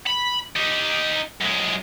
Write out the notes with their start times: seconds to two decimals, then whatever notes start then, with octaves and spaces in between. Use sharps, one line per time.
0.07 B5
0.56 D#4 G4
1.41 F#2 G#3